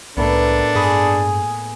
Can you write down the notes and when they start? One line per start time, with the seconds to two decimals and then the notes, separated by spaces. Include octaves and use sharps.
0.17 C2 A2 A#3 B3 D4 A4
0.75 G2 G#4 B5